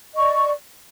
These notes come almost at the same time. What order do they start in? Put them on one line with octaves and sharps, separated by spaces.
D#5 C#6 D5